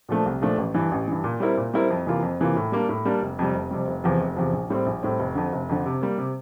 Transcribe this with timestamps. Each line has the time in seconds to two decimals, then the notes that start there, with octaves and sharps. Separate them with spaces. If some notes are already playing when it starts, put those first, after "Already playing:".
0.09 A#2 F3 A3 D4
0.26 C2
0.42 A#2 F3 A3 D4
0.58 A1
0.74 G2 E3
0.91 A1
1.08 G2 E3
1.24 A#2
1.40 G3 C4 E4 A#4
1.57 A#2
1.74 G3 C4 E4 A#4
1.90 F2
2.07 C3 E3 A#3 F4
2.22 F2
2.40 C3 E3 A#3 F4
2.56 A2
2.72 G3 A#3 D4
2.89 A2
3.05 G3 A#3 D4
3.22 F1
3.39 F2 C3 G3
3.54 F1
3.71 F2 C3 G3
3.87 F1
4.04 E2 C3 F3
4.20 F1
4.36 E2 C3 F3
4.53 A#1
4.70 A2 G3 C4
4.86 A#1
5.03 A2 G3 C4
5.19 F1
5.35 F2 D3
5.52 F1
5.69 F2 D3
5.86 C3
6.01 G3 A#3
6.18 C3